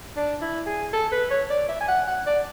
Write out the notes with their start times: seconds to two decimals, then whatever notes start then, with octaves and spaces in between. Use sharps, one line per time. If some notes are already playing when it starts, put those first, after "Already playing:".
0.16 D4
0.41 E4
0.66 G#4
0.93 A4
1.12 B4
1.31 C#5
1.50 D5
1.68 E5
1.80 G#5
1.88 F#5
2.07 F#5
2.26 D5